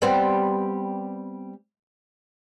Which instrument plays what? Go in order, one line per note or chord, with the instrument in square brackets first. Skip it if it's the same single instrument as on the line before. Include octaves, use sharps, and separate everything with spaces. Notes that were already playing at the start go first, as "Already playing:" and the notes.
[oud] G3 B3 C4